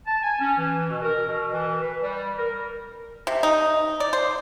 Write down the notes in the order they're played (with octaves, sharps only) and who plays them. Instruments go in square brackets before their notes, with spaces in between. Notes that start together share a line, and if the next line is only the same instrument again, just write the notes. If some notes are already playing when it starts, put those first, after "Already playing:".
[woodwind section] A5
G#5
C#4
E3
B2
A#4
B2
E3
B4
G3
A#4
[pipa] C3
D#4
D5
C5